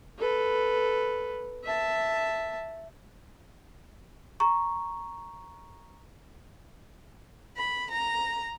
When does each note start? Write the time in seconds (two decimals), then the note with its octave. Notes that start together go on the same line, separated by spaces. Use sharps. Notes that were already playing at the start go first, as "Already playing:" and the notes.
0.18 A4 B4
1.64 E5 A5
4.40 A#5 C#6
7.56 B5
7.90 A#5